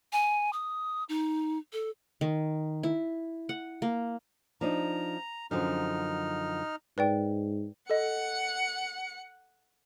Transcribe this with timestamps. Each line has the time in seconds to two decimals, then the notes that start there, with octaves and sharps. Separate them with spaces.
0.13 G#5
0.53 D#6
1.09 D#4
1.73 A4
2.21 D#3
2.83 E4
3.49 F#5
3.82 A#3
4.61 F3 D4 D#4 A#5
5.51 F#2 D3 F3 D#4 F6
6.98 G#2 B4 D5 G5
7.90 A4 D#5 F#5 C#7